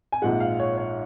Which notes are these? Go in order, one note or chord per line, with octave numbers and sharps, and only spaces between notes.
G#5
A#1 G#2 F3 G#3 F#5
F5
C#5
C#5